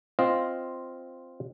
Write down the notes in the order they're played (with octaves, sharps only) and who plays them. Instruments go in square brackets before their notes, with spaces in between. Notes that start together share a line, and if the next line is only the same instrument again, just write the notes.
[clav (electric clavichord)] C4 F4 D#5 F5